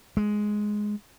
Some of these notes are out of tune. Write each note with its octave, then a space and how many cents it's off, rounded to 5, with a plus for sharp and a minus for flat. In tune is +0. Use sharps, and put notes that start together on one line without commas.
G#3 +5